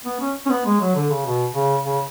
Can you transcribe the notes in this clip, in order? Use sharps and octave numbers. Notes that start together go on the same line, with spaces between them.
B3
C#4
C#4
B3
G#3
F#3
D3
C#3
B2
C#3
C#3